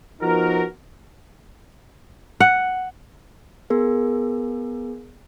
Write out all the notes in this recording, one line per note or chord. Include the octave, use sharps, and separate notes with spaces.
F3 B3 D#4 F#4 A#4
F#5
B3 G#4 A#4